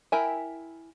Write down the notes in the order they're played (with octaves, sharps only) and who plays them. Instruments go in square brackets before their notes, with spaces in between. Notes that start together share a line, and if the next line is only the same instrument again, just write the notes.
[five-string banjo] E4 A#4 E5 G5 G#5